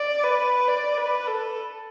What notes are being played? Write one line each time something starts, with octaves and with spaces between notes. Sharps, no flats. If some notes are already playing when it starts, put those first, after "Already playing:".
Already playing: D5
B4
D5
B4
A4